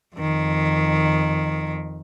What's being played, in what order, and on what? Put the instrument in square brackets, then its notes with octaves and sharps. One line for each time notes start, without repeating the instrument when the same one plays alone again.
[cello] F2 D#3